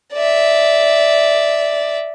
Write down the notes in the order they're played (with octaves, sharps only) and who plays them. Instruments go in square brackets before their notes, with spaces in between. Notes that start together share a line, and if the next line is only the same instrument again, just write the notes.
[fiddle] D5 E5